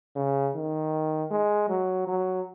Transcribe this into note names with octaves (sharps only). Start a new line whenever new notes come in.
C#3
D#3
G#3
F#3
F#3